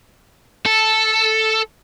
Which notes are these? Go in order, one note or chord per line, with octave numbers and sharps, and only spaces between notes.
A4